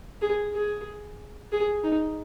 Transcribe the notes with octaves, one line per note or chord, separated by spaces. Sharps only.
G#4
G#4
G#4
D#4